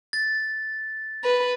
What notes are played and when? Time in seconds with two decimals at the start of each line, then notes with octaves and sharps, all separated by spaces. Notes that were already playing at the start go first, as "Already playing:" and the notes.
0.13 A6
1.24 B4